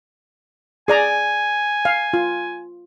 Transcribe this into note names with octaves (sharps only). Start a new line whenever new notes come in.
G#4 D5 G#5 A#5
F5
F4